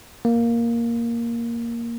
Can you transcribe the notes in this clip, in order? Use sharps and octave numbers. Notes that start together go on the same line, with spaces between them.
A#3